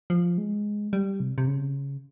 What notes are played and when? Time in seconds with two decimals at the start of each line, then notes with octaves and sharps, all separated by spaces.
0.10 F3
0.38 G#3
0.93 G3
1.20 C3
1.38 C3
1.47 C#3